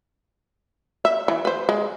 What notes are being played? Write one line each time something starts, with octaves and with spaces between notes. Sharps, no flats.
E5
E3
B4 C5
G#3